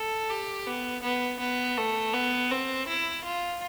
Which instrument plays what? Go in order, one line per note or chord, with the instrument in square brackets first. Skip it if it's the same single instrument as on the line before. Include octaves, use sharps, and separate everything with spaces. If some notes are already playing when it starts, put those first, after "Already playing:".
Already playing: [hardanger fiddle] A4
G4
B3
B3
B3
A3
B3
C4
E4
F4